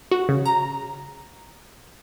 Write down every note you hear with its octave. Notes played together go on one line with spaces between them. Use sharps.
F#4
C#3
A#5